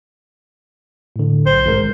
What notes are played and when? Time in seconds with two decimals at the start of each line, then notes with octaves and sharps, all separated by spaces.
1.16 A2 D3
1.46 B1 C5
1.66 G#1 G#3 A#4